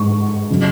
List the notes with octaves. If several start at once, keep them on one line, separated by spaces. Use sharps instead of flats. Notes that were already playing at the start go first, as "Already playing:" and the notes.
Already playing: G#2 G#3 C#6
C#3 F#3